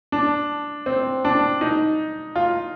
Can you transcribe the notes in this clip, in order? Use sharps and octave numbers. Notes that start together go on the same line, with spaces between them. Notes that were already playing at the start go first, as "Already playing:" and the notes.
D4
C4
D4
D#4
F4